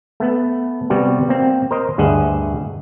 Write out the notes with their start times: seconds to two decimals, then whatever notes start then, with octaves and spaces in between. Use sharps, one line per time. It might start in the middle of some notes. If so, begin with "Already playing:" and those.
0.20 A3 B3
0.90 C3 G3 B3 F#4
1.29 A#3 C4
1.71 A#4 C5 D#5
1.98 D2 G2 G#4 D#5 E5 F#5